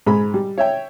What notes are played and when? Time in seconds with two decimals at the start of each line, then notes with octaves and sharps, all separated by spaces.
0.07 G#2 G#3 B5
0.34 G3
0.58 C#5 E5 G5